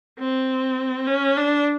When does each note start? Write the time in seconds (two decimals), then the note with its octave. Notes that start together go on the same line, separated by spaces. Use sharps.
0.19 C4
1.07 C#4
1.37 D4